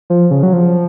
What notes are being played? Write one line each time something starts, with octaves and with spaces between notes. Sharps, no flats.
F3
C#3
F#3
F3